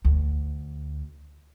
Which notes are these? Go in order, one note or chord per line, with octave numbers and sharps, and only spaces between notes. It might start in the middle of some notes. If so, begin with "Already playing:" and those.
D2